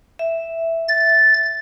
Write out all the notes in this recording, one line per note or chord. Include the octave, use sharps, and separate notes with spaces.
E5
A6